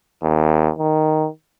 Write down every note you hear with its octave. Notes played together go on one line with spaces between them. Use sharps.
D#2
D#3